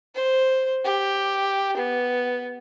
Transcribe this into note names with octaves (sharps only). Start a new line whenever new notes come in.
C5
G4
B3